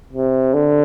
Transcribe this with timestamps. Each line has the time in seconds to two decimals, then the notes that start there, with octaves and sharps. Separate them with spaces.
0.13 C3
0.54 D3